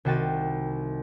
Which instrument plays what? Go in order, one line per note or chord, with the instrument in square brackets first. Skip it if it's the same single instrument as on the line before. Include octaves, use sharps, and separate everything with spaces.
[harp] C2 D#3 F#4 G5 A6 D#7